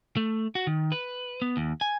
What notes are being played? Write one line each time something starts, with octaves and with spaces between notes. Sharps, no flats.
A3
F#4
D#3
B4
B3
D#2
G#5